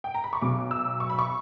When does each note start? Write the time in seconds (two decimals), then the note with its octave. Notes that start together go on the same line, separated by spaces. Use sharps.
0.04 G5
0.14 A#5
0.24 B5
0.33 C#6
0.42 B1 B2 F#3 D6
0.71 E6
1.00 C#6
1.10 B5
1.19 C#6